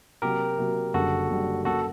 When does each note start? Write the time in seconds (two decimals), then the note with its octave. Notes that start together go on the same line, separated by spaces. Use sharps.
0.22 C3 F#3 A#3 F#4 G4 A#4
0.58 C3 F#3 A#3 F#4
0.94 F#1 F#2 D3 G3 F#4 A4
1.30 F#1 F#2 D3 G3
1.65 F#2 F#3 A#3 F#4 A4